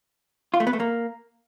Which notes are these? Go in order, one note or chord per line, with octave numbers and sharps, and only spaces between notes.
F4
A3
B3
A3
A#3